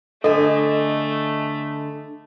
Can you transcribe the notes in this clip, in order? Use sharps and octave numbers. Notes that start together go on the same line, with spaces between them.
D3 A3 A4 D#5 G#5